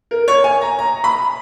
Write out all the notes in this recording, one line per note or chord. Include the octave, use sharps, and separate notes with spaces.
A#4
C#5
G#5
A#5
A#5
B5